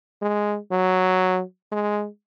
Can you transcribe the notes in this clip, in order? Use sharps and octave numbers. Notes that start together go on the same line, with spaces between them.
G#3
F#3
G#3